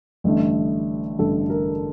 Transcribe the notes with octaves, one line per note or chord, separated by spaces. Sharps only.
A1 G2 D3 A3
A1 G2 D3 A3 A4
A#4